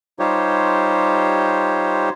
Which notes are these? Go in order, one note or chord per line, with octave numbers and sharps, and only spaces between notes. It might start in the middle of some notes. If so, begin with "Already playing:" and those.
G3 D#4 F4 G4 C5 C#5